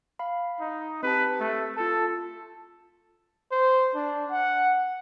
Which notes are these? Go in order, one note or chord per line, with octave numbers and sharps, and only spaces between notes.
F5 B5
D#4
C4 G4 B4 A5
A3
F4 A4 A5
C5
D4
F#5